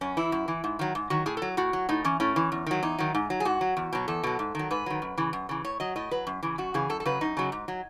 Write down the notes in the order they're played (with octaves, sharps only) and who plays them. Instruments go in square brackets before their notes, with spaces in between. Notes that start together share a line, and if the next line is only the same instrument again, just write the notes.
[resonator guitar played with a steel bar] F#2 C#4
E3 E4
F#2
E3
G#2
D#3 F#3
G#2
D#3 F#3 F#4
A2 G#4
F#3 A4
A2 F#4
F#3
A2 D#4
E3 C#4
A2 C#4
E3
E2
D#3 F#3
E2 D#4
D#3 F#3
G#2
F#3
G#4
G#2 F#4
F#3
E2
B2 F#3
E2 A4
B2 F#3
G#2
D#3 F#3
G#2 B4
D#3 F#3
F#2
C#3 E3
F#2
C#3 E3
A2 C#5
F#3 D#5
A2 D#5
F#3 B4
F#2
C#3 E3
F#2 F#4
C#3 E3 G#4
F#2 A4
A4
C#3 F#3 B4
F#2 D#4
C#3 F#3
G#2
F#3